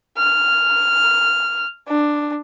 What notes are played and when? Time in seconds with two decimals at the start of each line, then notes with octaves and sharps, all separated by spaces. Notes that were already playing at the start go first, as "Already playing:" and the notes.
0.17 F6
1.88 D4